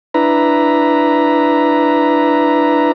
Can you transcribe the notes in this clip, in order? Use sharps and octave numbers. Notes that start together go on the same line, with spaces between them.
D4 E4 B4 A#5